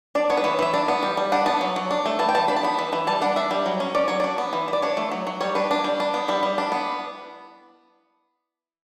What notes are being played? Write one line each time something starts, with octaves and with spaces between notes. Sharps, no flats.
D4 D5
B3 C#5
B4
E3 C#5
E3 E5
D4 D5
B3
G3
G3
D4 F#5
B3 A5
F#3
F#3
D4
A3
E3 A5
G5
E3 A5
D4 B5
A5
B3 B5
E3
E3
G3 A5
D4 F#5
D4 E5
G3
F#3
C#4
C#4 D5
F#3 C#5
D4 D5
B3
E3
E3
D5
D4 C#5
A3
F#3
F#3
G3 C#5
D4 B4
D4
G3
D4
B3
G3 E4
G3
D4
B3